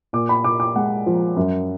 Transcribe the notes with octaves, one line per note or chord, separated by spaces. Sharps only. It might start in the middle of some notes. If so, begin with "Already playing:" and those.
A#2 D6
B5
A#2 D6
D6
G#3 F#5
F3
F#2